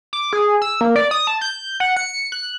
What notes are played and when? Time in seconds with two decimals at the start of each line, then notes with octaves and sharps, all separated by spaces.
0.13 D6
0.33 G#4
0.62 E6
0.81 A#3
0.96 D5
1.11 D#6
1.27 A5
1.41 G6
1.80 F#5
1.97 C#7
2.32 F#6